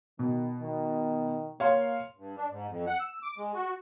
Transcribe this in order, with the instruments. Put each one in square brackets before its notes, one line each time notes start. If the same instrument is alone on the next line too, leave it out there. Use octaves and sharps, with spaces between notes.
[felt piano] B2 [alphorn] D#3
[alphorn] D#3
[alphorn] A#3 [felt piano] C#5 F5 C6
[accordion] G2
D4
G#2
F2
F#5
E6
D6
G#3
F#4